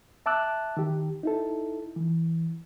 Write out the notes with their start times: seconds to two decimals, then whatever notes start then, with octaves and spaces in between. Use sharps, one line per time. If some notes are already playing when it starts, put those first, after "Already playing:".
0.26 E5 A5 D6 E6 F#6
0.77 D#3 G4
1.23 D#4 E4 A4
1.96 E3